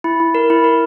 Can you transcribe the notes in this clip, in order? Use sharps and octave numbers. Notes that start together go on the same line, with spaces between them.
E4
E4
A#4
E4
A#4